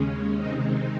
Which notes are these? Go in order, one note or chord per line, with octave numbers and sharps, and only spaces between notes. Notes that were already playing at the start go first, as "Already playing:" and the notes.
Already playing: D#2 C#3 G#3 C#4
C3 D#3 G#3 C4 D#4